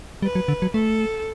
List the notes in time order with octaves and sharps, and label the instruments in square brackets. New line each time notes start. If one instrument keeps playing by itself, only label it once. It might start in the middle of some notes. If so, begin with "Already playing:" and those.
[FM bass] G3 [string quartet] B4
[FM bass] F#3
D3
F#3
[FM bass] A3 [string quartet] A4